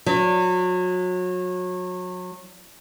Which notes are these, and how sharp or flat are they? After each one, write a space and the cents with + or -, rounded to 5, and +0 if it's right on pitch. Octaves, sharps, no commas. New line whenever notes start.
F#3 -30